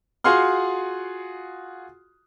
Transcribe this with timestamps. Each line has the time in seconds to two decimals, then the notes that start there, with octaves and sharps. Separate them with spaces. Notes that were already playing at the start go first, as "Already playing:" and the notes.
0.24 F4 F#4 G#4 F#5 C6 F6